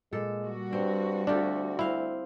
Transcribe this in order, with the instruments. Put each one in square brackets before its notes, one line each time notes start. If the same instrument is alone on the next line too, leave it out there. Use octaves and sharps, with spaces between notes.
[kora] A#2 A4 [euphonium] G#3
[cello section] G3 F#4
[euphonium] G2 [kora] C4
[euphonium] D2 [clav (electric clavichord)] D4 [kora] F4 G4 A4
[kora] C4 F5 [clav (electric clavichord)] E4